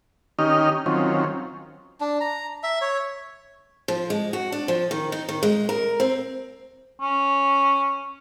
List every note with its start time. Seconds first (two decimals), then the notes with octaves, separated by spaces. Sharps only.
0.39 D#3 C#4 D#4 G4 D#5 F6
0.86 D#3 F#3 C4 C#4 F4
2.00 D4
2.21 A#5
2.63 E5
2.81 C#5
3.88 F3
4.10 G#3
4.33 F#4
4.52 D4
4.68 F3
4.91 D#3
5.12 D#4
5.29 D#3
5.43 G#3
5.69 A#4
6.00 C4
7.01 C#4